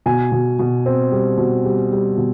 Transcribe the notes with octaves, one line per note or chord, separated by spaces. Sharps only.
B2 G#5
B2
B2
C4
G3
B2
G3
G3
B2